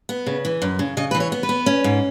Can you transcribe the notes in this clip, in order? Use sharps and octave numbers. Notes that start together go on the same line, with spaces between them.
B3
C#3
E3
F#2
C#3
C#3 D#5
E3 B4
C#5
B3
B4
B3
C#4
G#2